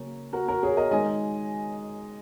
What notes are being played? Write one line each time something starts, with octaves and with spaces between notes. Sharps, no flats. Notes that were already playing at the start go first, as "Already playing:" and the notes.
Already playing: C#3 F#3 A#3 C#4
F#4 A#4
F#4 A#4
G#4 C#5
A#4 D#5
D#3 G#3 D#4 D#5 G#5